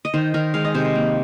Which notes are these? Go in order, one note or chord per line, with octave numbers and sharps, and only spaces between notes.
D#5
D#3 C5
D#3 A#4
G#3 F5
D#5
C3 C5
C5
A#3